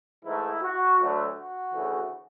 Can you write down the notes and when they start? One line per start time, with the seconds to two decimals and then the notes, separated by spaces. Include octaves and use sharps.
0.24 G#2 E3 A3 E4
0.62 F#4
0.99 D2 D3 F#3 A3
1.37 F#4
1.73 D2 C#3 E3 A3